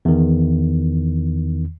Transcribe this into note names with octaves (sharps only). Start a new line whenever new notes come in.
E2 D#3